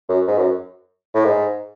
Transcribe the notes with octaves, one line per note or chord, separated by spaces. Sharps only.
F#2
G#2
F#2
A2
G#2